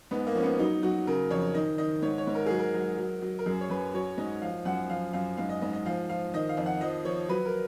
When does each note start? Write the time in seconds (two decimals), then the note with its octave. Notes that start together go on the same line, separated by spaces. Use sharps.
0.11 G#2 B3
0.27 A#3
0.35 F3 C#4
0.43 B3
0.59 F#3 D#4
0.83 F#3 F#4
1.07 C#3 A#4
1.31 F2 C#5
1.54 D#3 D#5
1.78 D#3 D#5
2.02 G#2 C#5
2.18 C#5
2.27 G#2
2.35 A#4
2.46 F#3 G#4
2.59 A#4
2.74 F#3
2.98 F#3
3.22 F#3
3.39 A#4
3.46 F#2 G#4
3.61 C#5
3.70 F#2 B4
3.94 F#3 C#5
4.18 G#2 D#5
4.42 F3 F5
4.65 F#2 F#5
4.90 F3 F5
5.13 F#2 F5
5.37 G#2 F5
5.49 D#5
5.61 G#2 D#5
5.73 D#5
5.86 F3 F5
6.09 F3 F5
6.34 D#3 D#5
6.49 F5
6.57 F2
6.66 F#5
6.81 F3 D#5
7.05 F3 C#5
7.29 F#3 B4
7.46 A#4